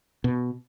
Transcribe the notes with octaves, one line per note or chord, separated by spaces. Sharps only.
B2